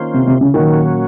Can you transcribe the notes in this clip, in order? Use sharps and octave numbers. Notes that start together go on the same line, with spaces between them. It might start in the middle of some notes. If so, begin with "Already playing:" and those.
Already playing: D#3 A#3 C#4 F4 C5
C3
C3
C#3
A#2 D#3 F#3 A#3 C#4 F#4